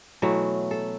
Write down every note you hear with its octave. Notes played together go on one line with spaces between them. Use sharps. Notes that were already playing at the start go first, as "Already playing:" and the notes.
B2 E3 F#3 A3
A4